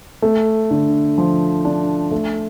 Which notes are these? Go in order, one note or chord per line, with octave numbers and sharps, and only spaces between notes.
A3
D3
F3
D4
A3